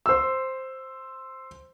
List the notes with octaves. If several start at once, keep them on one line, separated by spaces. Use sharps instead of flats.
C5 E6